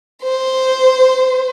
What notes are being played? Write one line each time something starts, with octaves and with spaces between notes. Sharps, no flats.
C5